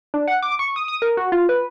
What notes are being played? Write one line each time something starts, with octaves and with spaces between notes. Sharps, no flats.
D4
F#5
D6
C#6
D#6
D#6
A#4
F#4
F4
B4